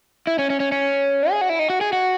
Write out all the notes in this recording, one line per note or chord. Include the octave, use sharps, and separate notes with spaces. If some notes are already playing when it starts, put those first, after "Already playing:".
E4
C#4
C#4
C#4
C#4
G#4
F#4
E4
D#4
F#4
G#4
F#4